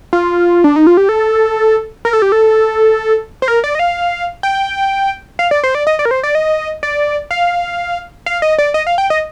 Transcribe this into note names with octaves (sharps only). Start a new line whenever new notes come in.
F4
D4
D#4
F4
G4
A4
A#4
A4
G4
A4
C5
A#4
D5
D#5
F5
G5
F5
D5
C5
D5
D#5
D5
A#4
C5
D5
D#5
D5
F5
F5
D#5
D5
D#5
F5
G5
D#5